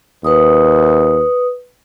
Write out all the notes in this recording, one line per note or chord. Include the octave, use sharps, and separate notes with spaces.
D#2 B4 D#6